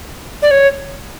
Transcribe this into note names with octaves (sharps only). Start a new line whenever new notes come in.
D5
C#5